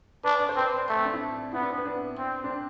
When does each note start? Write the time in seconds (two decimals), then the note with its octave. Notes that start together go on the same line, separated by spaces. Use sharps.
0.24 D4 B4
0.40 D5
0.49 C5
0.56 C4 B4
0.89 A3
0.97 C4
1.05 D4
1.13 E4
1.53 B3 E4
1.62 D4
1.70 C4
1.78 B3
1.86 D4
2.18 C4
2.44 D4
2.50 C4